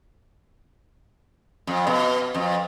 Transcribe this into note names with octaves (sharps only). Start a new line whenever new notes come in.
F2
B2
F2